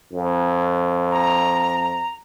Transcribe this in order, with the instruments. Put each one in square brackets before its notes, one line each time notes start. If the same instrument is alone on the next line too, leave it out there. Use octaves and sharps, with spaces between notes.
[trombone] F2
[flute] A#5